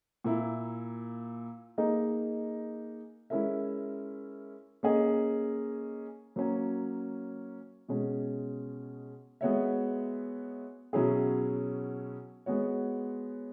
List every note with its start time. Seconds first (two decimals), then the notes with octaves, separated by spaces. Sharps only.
0.24 A#2 A#3 E4
1.78 A#3 D#4 G#4 D#5
3.30 G#3 C#4 E4 A#4 E5
4.83 A#3 C#4 G#4 D#5
6.36 F#3 A#3 C#4
7.88 B2 G#3 C#4
9.41 G#3 B3 F#4 C#5 E5
10.93 B2 F#3 C#4 E4 G#4
12.46 G#3 B3 F#4 C#5